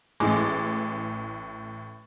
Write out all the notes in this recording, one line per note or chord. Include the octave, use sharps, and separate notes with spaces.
A1 A2 G#3 D6